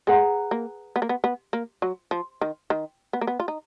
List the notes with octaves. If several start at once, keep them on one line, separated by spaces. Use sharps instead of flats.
G#3 G#4 B4 F#5 A#5
A#3
B3
A#3
B3
B3
A#3
F#3
F3
D#3
D#3
B3
A#3
B3
F4
D#4